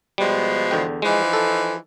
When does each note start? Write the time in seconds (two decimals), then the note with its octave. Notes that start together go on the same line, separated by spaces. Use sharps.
0.18 B2 F3 G3 G#3
0.71 E2 D3 G5
1.02 E3 F3 G#3 D#4
1.33 A4